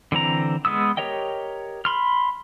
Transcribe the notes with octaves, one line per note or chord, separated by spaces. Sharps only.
D3 E3 C4 A#5
G#3 B3 D#6 E6
G4 A#4 C#5 D#5 G5
B5 C6 F6